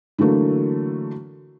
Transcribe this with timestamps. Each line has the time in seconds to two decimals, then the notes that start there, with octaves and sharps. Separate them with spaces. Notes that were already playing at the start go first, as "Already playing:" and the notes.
0.18 D3 E3 F#3 A3 A#3